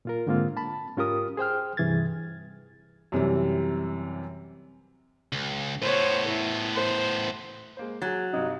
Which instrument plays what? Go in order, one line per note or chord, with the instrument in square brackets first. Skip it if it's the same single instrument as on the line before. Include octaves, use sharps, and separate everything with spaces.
[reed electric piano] A#2 F4 A#4
G#2 D3 G#3 A#3 C4 F4
A5 B5
G#2 C#4 F4 G4 A#4 D#6
G#4 C5 G5 F6
G2 C3 E3 G#4 G#6 A6
[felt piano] F#2 C3 E3 G3
[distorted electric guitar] C#2
[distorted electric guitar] A2 B3 [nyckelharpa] C5 C#5
[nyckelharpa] E4
C5
[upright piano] G#3 A#3 C5
[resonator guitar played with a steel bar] F#3 [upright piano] G#4 A6
[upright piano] G2 C3 [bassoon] D#4